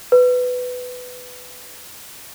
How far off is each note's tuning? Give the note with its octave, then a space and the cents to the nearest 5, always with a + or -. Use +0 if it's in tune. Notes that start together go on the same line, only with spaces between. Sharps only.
B4 +15